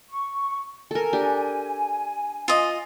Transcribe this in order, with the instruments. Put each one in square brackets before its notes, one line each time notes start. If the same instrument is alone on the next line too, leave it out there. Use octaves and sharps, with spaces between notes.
[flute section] C#6
[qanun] A4 A#4 [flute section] G#5
[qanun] D4 G4
[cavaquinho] F4 D#5